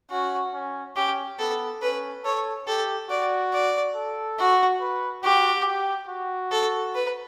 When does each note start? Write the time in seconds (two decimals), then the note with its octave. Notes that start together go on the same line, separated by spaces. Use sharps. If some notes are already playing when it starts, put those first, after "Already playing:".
0.11 C#4 F#4
0.54 C#4
0.96 C#4 G4
1.39 B3 A4
1.82 C#4 B4
2.24 A4 C#5
2.67 G4 A4
3.10 F#4 D5
3.53 D5
3.95 A4
4.38 F#4
4.81 B4
5.23 F#4 G4
5.67 G4
6.09 F#4
6.51 A4
6.95 B4